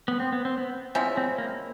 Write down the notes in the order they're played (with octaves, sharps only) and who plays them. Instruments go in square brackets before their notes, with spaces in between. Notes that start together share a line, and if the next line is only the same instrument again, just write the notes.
[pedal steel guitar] B3
C4
B3
C4
B3
[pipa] F3 G#3 C#4 E4 [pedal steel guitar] C4
[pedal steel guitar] C4
A#3